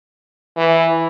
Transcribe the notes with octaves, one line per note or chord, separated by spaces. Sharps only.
E3